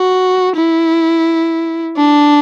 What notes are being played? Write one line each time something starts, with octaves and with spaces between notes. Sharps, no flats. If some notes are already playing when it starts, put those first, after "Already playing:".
Already playing: F#4
E4
D4